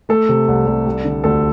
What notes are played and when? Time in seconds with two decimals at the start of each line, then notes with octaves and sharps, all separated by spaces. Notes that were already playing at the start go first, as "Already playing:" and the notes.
0.09 A3 A4
0.29 C3
0.48 C2
0.67 C2
0.86 G3
1.05 D3
1.24 D2 A4